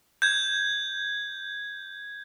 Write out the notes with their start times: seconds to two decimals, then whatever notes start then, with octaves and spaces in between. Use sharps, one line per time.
0.22 G6 G#6